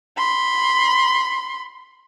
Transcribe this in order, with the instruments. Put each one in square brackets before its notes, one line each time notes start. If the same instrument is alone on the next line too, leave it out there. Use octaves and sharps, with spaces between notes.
[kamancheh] B5 C6